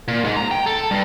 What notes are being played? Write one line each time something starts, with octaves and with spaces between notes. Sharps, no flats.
A#2
G#2
A#5
G5
A4
G2